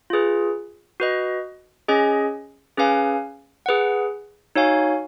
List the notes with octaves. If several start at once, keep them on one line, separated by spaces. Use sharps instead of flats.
F4 G#4 B4
F#4 B4 D#5
C#4 G#4 D#5 G#5
C#4 G#4 B4 F5 G#5
G#4 B4 F#5
D#4 F#4 C#5 F5 G#5